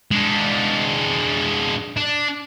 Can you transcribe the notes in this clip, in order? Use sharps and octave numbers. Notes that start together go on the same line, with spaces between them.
G#3 D4
D4